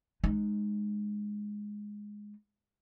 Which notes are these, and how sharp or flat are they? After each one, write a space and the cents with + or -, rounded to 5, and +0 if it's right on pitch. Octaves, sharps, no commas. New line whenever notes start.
G#3 +0 D#4 -15